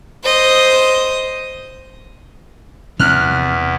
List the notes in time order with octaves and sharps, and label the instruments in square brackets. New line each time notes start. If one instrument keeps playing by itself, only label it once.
[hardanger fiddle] C5 D#5
[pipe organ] E2 [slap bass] C3 F3 C4 [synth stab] F6 F#6